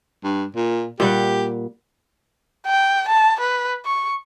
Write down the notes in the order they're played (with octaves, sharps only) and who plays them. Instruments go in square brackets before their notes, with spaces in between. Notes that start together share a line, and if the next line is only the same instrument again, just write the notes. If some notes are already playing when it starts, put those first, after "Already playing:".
[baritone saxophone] G2
A#2
[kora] A#2 G3 F#5 [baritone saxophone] G4
[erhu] G5
A5
B4
C#6